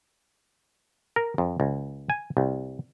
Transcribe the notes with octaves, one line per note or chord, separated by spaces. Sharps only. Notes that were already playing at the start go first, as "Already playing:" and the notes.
A#4
F2
C#2
G#5
C2